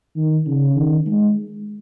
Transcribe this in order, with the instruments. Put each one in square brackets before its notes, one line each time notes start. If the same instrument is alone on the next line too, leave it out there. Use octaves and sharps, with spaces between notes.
[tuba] D#3
C#3
D#3
G#3